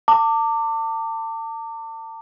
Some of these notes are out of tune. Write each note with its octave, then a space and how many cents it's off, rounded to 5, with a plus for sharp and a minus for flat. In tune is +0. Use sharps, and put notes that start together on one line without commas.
A5 +40 D6 +0